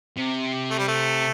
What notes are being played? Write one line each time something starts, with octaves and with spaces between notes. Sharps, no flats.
C3
A3
G3
A3